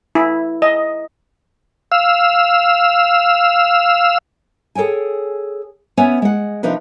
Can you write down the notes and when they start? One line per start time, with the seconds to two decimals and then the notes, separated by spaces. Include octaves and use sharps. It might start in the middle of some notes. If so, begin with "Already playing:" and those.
0.15 E4
0.62 D#5
1.92 F5 E6
4.75 G#4 A4 C#5 G5 G#5
5.97 B3 C#4 C#5 E5 F#5 G#5
6.22 G#3 F#5
6.63 C3 F3 D4 D#4 B4